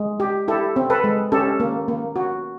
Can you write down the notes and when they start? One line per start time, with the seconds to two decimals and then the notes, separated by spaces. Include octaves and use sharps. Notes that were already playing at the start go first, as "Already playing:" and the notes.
Already playing: G#3
0.20 G4
0.48 E4 G4 A4
0.76 C4
0.90 A4 B4
1.04 G#3
1.32 C#4 G4 A4
1.60 A#3
1.88 A#3
2.16 F#4